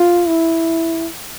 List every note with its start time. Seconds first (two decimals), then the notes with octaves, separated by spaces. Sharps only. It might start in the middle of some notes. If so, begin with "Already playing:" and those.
Already playing: F4
0.27 E4